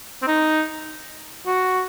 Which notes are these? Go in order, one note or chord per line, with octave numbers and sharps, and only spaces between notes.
C4
D#4
F#4